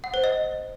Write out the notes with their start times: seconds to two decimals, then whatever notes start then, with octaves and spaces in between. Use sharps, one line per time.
0.04 F#5
0.14 C5
0.24 D#5